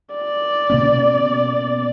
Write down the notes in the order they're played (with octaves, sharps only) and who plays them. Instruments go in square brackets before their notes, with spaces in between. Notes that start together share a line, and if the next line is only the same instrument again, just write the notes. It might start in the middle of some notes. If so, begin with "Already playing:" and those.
[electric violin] D5
[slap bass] B2 A#3 C#4